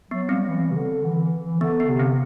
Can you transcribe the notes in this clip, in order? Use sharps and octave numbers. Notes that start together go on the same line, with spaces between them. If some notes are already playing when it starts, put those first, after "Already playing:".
F#3 B3
G3 C4
E3
C3
D3
E3
E3
D3 B3
B3
C3
C4